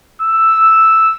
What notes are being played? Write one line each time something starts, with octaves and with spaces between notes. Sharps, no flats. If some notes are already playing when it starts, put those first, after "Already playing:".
E6